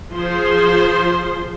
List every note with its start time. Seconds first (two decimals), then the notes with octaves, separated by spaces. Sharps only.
0.12 F3 G#4 C5 C6